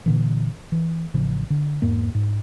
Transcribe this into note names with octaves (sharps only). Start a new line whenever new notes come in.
A#2 D3 E3
E3
A1 C#3 F3
D3
E2 G#2 A#3
G#2